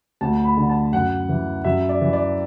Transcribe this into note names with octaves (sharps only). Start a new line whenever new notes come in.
D2 A5
B5
D3
A5
F#2 F#5
E3
F#2 E5
D5
E3
D5